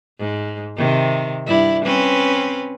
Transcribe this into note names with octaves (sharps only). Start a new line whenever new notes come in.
G#2
C3 D#3
G2 E4 D5
C4 C#4 B4